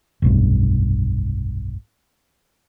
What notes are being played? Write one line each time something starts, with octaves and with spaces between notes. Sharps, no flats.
F1 B1 G2